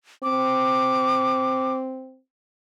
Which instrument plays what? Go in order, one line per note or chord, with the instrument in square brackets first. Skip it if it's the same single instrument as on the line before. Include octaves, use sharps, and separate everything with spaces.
[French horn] C4 [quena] D6